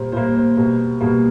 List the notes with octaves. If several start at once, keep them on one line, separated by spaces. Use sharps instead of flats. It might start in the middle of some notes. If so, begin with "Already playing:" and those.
Already playing: A#2 G3 A#3 C5
A#2 G3 A#3 C5
C5
B2 G3 A#3
B2 G3 A#3